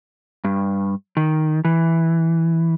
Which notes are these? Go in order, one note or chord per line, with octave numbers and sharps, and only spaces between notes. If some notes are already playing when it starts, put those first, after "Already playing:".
G2
D#3
E3